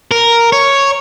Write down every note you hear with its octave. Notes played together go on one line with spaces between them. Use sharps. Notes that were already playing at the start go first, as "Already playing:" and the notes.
A#4
C#5